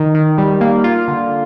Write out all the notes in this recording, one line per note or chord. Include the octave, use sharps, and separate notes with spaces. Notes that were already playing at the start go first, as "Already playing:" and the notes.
Already playing: D#3
D#3
G3
A#3
F4
D3